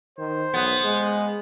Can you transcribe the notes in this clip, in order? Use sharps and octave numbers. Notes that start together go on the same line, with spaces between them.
D#3 C5
B1 B3
G#3